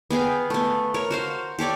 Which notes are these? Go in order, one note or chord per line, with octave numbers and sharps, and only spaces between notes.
B3 G#4 F5 G5
A3 B3
A#4 C#5
F#4 C5 F5
G4 A4 C#5 D5